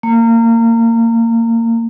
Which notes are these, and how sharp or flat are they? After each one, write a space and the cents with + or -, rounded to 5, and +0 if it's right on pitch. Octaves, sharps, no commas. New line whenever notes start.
A#3 -25